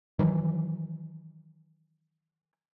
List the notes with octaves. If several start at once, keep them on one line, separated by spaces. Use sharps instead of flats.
D#3 E3 F#3